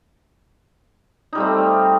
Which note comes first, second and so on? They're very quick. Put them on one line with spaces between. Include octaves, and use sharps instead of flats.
D#4 G3 A3 C4